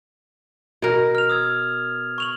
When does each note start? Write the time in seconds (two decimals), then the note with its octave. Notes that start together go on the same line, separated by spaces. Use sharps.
0.82 B2 A#4
1.15 F6 F7
1.30 D#6 E6 G#6
2.18 C#6 F7 F#7